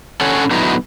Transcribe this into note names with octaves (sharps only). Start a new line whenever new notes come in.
D3 C#4 A4 C#5 F#5 G#5
D3 F#3 B3 D#4 E4